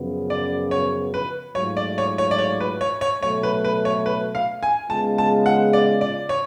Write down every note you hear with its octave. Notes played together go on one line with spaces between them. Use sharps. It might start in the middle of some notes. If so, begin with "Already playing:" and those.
Already playing: F#2 C#3 F3 B3
D5
C#5
B4
G#2 F#3 A3 F4 C#5
D5
C#5
C#5
D5
C#5
B4
C#5
C#5
B2 F#3 A3 C#5
B4
B4
C#5
B4
F5
G#5
C#3 G#3 B3 F4 A5
A5
F#5
D5
D5
C#5